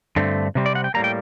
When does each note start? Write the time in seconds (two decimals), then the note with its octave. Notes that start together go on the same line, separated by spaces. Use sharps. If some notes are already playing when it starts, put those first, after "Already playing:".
0.16 G2 D3 A3 C4
0.55 C3 G3 C4
0.66 D5
0.75 F#5
0.84 G5
0.94 A2 G3 A#3 A#5
1.04 G5